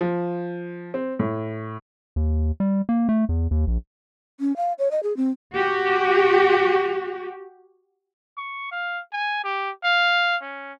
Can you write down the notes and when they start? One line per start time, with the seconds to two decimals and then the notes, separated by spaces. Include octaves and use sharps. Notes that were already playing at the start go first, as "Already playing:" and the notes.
0.01 F3
0.94 C4
1.19 A2
2.16 D#2
2.60 G3
2.89 A#3
3.09 A3
3.29 E2
3.51 D#2
3.67 A#1
4.40 C#4
4.57 F5
4.79 C#5
4.91 D#5
5.03 G#4
5.17 C4
5.53 F#4 G4
8.37 C#6
8.72 F5
9.13 G#5
9.44 G4
9.84 F5
10.42 C#4